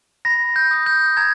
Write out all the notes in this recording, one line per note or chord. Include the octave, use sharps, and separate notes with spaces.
B5 A#6
G6
D#6 G6
G6
A#5 G#6